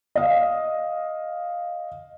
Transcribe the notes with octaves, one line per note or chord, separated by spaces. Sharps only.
D#5 F5